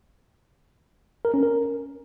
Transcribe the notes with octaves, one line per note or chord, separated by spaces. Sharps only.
A#4
C#4
A#4